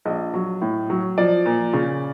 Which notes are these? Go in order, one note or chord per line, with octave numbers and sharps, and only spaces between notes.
A#1 D#5
F#3
A2
F#3
F3 D5
A#2
C#3